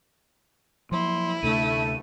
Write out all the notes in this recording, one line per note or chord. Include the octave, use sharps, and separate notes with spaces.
F3 F#3 A#3 E4 C6
D2 C3 A3 D4 D#7